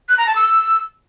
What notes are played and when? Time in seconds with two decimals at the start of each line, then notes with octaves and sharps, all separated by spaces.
0.09 F#6
0.18 A#5
0.27 A5
0.36 E6